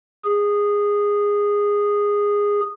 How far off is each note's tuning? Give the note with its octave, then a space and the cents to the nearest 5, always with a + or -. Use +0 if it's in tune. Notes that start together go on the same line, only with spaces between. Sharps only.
G#4 -15